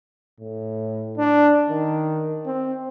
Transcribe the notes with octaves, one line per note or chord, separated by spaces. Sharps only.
A2
D4
D#3
C4